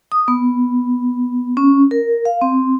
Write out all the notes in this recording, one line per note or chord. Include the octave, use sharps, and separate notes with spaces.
D#6
B3
C#4
A#4
F5
C4